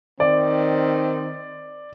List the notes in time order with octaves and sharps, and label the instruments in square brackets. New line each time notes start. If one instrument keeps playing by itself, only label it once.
[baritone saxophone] D#3 [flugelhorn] C4 [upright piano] D5